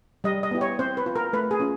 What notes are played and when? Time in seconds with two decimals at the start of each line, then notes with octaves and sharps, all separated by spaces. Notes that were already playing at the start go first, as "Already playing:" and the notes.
0.24 G3 D#5
0.43 D#5
0.51 B3 E4 G4
0.61 C#5
0.79 C4 C5
0.97 B4
1.06 F4
1.16 A#4
1.33 A3 B4
1.51 G#4
1.60 C#4 F4